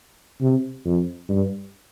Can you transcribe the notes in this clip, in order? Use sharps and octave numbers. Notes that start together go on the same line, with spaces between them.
C3
F2
G2